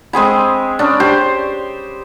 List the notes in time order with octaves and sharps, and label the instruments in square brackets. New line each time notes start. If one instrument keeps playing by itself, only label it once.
[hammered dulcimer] G#3 C4 G#4 B5
C#4 D4
G4 C5 C#5